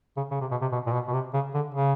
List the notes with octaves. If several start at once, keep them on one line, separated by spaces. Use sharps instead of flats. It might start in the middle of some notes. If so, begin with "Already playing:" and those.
C#3
C#3
C3
B2
C3
B2
A#2
B2
B2
C3
C#3
D3
C#3